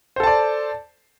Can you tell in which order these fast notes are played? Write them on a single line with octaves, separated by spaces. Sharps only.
C5 A4 A5 D5